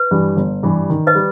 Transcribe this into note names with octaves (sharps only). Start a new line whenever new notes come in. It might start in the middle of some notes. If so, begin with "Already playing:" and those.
Already playing: B4
G2 E3 G3
G1
G2 E3 G3
D#3
B4 D#5
G3